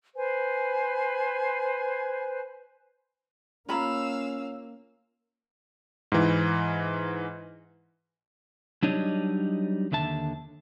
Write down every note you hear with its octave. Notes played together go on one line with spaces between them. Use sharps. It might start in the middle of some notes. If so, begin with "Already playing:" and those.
B4 C5 G#5
A#3 C#4 F4 F5 A#5 B5 E6
G#2 E3
F#3 G3 D4 D#4 C#5 D#5
D#2 D3 E5 A5